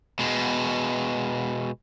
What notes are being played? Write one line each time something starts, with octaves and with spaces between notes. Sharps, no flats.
B2 G#3